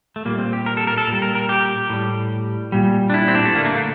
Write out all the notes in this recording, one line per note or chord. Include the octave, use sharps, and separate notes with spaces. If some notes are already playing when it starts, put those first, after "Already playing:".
A3
A#2 G3 A#3
C4
G4
A#4
A4
A#4
A4
A#2 G3
A#4
A#4
G4
A2 G3
A#2 G3
D4
E4
C4
D4
A3
D3 A3 A#3
A#3
A3